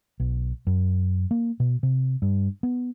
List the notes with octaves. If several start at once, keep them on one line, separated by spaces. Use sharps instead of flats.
B1
F#2
A#3
B2
C3
G2
B3